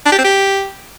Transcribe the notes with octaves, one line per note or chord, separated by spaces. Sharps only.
D4
G4
C4
G4